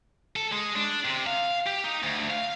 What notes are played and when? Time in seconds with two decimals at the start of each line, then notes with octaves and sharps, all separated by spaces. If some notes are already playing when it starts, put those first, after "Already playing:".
0.36 A4
0.52 G#3
0.76 D4
1.05 C3
1.27 F5
1.67 G4
1.84 D#4
2.03 D2
2.30 F5